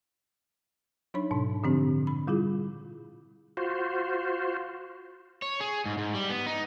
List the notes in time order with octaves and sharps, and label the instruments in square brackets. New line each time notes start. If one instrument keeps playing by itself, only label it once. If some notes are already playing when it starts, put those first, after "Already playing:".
[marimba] F#3 D4 D#4 C#5 B5
G#2 B2 D4
A#2 D3 F3 C4 D4 G4
B5
G3 E4 F4 G#4
[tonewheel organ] F4 F#4 C5
[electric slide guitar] C#5
G#4
G#2
G#2
G3
B3
D#4